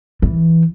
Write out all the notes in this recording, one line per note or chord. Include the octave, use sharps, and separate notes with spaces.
E3